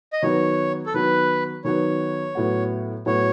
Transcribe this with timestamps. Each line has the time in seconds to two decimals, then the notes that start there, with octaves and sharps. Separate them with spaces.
0.13 D#5
0.23 D#3 F#3 B3 C#5
0.86 A4
0.94 D#3 F#3 B3 B4
1.65 D#3 F#3 B3 C#5
2.35 A2 F#3 B3 F#4
3.06 A2 F#3 B3 F#4 C#5